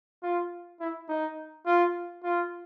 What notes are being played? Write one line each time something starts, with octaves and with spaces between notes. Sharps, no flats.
F4
E4
D#4
F4
F4